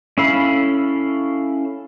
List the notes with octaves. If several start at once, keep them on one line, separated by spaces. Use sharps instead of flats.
C#4 E4 A4 F5 B5